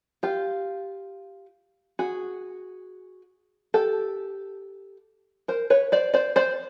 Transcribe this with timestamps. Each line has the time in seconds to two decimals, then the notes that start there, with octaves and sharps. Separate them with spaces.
0.23 F4 G4
1.99 F#4 G#4
3.74 G4 A4
5.48 A#4 C5
5.70 B4 C#5
5.92 C5 D5
6.14 C5 D5
6.36 C5 D5